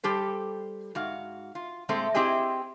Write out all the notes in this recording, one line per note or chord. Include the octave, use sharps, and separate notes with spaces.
G3 G4 A4 C5
G#2 F#4 F5
F4
A#2 G#3 A3 C4
C4 E4 G4 G#4 D#5